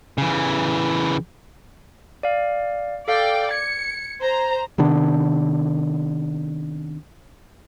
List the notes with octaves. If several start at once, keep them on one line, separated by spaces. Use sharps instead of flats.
C#3 E3
D5 F5
A4 D5 F5 G5
G#6 C#7
C5 A#5
C3 D#3 B3 D4